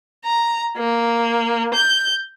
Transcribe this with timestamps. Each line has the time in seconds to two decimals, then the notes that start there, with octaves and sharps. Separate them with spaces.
0.24 A#5
0.77 A#3
1.74 G6